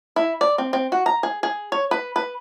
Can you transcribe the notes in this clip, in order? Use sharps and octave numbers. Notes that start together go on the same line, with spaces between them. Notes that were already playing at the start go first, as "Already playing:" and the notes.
E4
D5
C4
C4
F#4
A#5
G#4
G#4
C#5
B4
B4